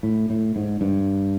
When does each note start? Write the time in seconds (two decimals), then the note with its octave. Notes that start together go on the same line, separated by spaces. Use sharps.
0.03 A2
0.30 A2
0.56 G#2
0.81 G2